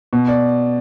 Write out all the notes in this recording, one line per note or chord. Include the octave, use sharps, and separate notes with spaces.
B2
D5